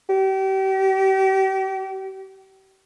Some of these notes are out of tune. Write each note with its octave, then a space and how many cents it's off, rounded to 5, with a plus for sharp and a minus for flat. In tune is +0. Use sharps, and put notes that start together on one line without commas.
G4 -35